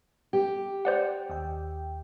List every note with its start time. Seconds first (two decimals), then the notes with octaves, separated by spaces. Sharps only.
0.33 G4
0.85 C5 D5 F#5
1.30 D#2 G5